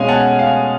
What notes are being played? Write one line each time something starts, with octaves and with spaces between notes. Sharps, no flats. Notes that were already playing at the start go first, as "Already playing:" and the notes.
Already playing: B2 G#3 C#4 F5 G#5
F#5 A5
F5